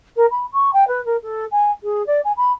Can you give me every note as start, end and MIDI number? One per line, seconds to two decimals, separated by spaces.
0.16 0.26 70
0.31 0.46 83
0.52 0.70 85
0.73 0.87 79
0.88 1.03 71
1.05 1.17 70
1.23 1.45 69
1.52 1.71 80
1.83 2.05 68
2.07 2.20 74
2.25 2.32 80
2.37 2.52 83